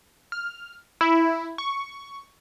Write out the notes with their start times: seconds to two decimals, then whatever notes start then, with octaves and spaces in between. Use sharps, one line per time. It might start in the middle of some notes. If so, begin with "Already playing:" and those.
0.32 F6
1.01 E4
1.58 C#6